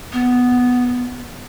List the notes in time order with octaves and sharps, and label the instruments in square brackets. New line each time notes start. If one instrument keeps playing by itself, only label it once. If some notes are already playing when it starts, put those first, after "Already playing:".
[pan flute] B3